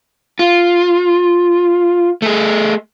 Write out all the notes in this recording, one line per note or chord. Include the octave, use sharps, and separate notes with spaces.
F4
A3 G#4